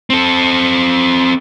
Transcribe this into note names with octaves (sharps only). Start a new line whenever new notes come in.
C4 A4